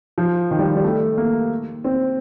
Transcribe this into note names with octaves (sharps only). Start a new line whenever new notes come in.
F3
D#3
G3
G3
A3
A#3
C4